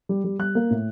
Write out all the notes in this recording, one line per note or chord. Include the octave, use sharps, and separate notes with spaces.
G3
G3
G3 F#6
A#3
A2